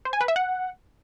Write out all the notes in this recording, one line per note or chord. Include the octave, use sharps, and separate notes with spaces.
C5
G#5
B4
E5
F#5